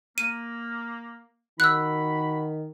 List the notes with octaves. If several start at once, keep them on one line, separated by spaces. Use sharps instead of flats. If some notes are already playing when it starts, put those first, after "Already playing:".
A#3 D#7
D#3 F#4 B5 E6 F#6